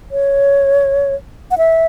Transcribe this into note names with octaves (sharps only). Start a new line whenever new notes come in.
C#5
F#5
E5